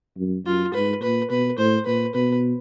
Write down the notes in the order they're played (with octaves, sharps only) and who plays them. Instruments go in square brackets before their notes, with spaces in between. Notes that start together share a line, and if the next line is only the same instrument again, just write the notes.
[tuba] F#2
[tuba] F#2 [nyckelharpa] F4
[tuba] G#2 [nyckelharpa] B4
[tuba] A#2 [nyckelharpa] B4
[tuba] B2 [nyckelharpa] B4
[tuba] A2 [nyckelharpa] C5
[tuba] A#2 [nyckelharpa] B4
[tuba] B2 [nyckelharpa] B4